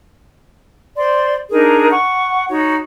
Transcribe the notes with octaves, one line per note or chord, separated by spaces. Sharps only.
C5 D5 C6
D4 D#4 G#4 A#4
F#5 C#6
D#4 F#4 C#5